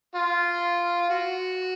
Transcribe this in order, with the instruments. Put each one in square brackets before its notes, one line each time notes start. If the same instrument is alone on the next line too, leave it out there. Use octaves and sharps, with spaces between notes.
[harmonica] F4
F#4